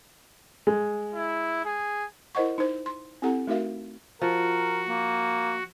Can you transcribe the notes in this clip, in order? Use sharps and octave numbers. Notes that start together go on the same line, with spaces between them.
G#3
E4
G#4
E4 A#4 C5 D#5 F#5 C#6
D#4 C5
C6
C4 E4 G4 A4 F#5 A#5
A3 D#4 F#4 A#4 E5 F5
F3 F#4 A#4
A#3